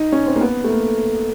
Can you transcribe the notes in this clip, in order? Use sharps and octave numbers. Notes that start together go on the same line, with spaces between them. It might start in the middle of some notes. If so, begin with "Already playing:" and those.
Already playing: D#4
C#4
C4
A#3
B3
A3
A#3